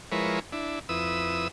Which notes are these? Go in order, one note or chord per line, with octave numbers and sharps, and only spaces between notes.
F3 G#3 E4 A#4 B4 C#5
D4 E4
F2 E4 B4 D#6 E6